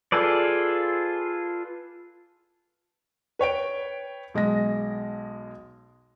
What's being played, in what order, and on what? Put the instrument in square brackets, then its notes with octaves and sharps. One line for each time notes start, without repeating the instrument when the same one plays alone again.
[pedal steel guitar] F4 G#4 A4 B4 D5
[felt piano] B4 C#5 G5 D7
B1 G#3 D#5 A#6